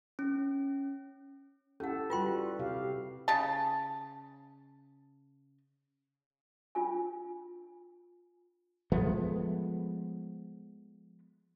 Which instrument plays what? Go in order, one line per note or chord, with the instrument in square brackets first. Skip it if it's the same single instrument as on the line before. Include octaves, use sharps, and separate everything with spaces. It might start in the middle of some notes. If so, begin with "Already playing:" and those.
[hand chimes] C#4
[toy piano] C#4 F#5 [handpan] E4 G4 A4
[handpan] G3 F#4 B4 [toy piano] F4 G5 C6
[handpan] C3 G4 F5
[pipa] C#3 A5
[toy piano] D4 F4 G#5
[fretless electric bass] F3 G#3 A3 B3